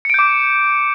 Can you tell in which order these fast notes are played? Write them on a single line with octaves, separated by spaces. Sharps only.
C#7 D7 G6 D6